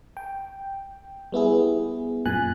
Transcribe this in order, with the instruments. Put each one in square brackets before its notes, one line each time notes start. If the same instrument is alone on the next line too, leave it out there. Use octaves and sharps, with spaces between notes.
[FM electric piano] G5
G3 B3 E4 G#4
F#2 A#2 G#5 F#6